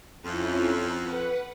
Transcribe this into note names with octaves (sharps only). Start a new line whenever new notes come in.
F2 C#4 E4 F4
B4 F#5